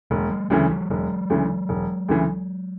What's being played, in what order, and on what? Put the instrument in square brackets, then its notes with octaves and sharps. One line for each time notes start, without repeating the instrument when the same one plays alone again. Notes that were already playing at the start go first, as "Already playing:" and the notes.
[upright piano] E1 [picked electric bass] G#3 A#3
[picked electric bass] G3 A3
[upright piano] D2 C#3 E3 [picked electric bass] F#3 G#3
[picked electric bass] F3 G3
[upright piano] E1 [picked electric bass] F#3 G#3
[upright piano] D2 C#3 E3
E1
D2 C#3 E3